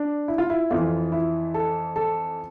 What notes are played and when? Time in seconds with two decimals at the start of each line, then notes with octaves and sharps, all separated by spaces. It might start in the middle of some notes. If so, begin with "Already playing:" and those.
Already playing: D4
0.28 E4
0.38 F4
0.50 E4
0.70 F2 E3 F4
1.12 E4
1.54 A4
1.96 A4